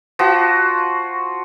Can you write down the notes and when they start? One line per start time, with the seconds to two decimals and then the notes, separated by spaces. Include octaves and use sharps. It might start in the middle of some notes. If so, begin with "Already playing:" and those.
0.19 F3 F#4